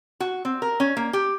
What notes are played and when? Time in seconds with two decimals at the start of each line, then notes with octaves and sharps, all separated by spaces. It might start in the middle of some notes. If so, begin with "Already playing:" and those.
0.20 F#4
0.45 C4
0.62 A#4
0.80 C#4
0.97 A#3
1.13 G4